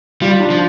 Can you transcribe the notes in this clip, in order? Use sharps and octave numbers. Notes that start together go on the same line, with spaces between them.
G3 F4
D4
F3